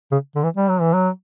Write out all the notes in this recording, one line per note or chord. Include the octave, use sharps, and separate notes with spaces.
C#3
D3
E3
G3
F#3
E3
F#3